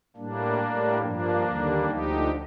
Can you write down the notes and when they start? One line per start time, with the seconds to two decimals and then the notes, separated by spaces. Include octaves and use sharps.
0.16 A2 G3 A#3 D4
0.59 A2 G3
1.02 G2 F3 A#3 D4
1.43 D#2 D3 G3
1.86 D2 D3 F3 D#4 G4